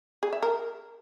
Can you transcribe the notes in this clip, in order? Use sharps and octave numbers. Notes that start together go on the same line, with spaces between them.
G#4
E5
A#4